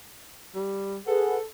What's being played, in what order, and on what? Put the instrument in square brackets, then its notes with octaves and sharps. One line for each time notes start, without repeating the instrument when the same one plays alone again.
[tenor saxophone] G3
[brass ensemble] G#4 B4 F#5 [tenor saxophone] A4